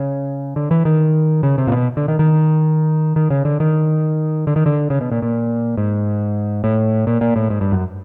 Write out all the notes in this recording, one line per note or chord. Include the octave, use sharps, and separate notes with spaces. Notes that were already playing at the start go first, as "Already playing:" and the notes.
Already playing: C#3
D3
E3
D#3
C#3
C3
A#2
B2
D3
D#3
D#3
D#3
C#3
D3
D#3
D3
D#3
D3
C#3
B2
A#2
A#2
G#2
A2
A#2
A#2
A2
G#2
G2
F#2